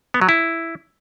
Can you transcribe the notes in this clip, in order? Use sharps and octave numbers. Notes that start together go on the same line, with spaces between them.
B3
F#3
E4